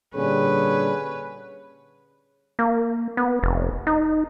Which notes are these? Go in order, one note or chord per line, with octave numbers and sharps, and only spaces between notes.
A#2 D3 G3 C#4 G#4 B4
A#3
B3
F1
D#4